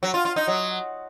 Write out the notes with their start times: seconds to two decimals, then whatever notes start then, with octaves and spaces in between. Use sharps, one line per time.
0.03 F#3
0.14 F4
0.25 F4
0.36 D#4
0.47 F#3